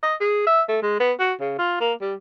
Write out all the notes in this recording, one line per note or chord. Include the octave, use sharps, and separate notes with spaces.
D#5
G#4
E5
A3
G#3
B3
F#4
C#3
F4
A#3
G3